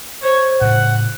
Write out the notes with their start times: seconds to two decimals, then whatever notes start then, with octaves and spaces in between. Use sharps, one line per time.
0.23 C5 C#5
0.61 A2 C#3 F#5